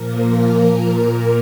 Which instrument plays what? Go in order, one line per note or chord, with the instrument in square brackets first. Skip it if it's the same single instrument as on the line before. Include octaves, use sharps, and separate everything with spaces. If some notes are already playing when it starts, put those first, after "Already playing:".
Already playing: [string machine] A#2 F3 A#3 A#4
A#4
A#2 A#3 A#4